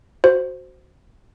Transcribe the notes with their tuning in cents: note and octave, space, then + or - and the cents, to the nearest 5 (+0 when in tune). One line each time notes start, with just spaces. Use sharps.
F#4 +0 C5 +0